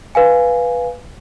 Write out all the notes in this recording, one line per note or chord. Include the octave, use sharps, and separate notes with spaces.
B4 F5 G#5